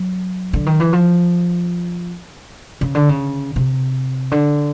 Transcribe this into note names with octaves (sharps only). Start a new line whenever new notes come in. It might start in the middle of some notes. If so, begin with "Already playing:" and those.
Already playing: F#3
D3
D#3
E3
F3
C#3
D3
C#3
C3
D3